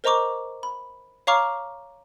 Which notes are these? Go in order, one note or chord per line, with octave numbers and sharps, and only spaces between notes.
A#4 C5 D#5 A#5 C#6 D6
B5
C#5 F5 A#5 C#6 D6 F6